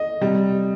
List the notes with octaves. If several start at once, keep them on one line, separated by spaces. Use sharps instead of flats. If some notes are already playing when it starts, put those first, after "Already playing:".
Already playing: D#5
C3 G3